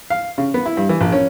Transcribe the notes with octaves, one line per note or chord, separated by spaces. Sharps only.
F5
C#3
B3
E4
G2
E3
A#1
C#4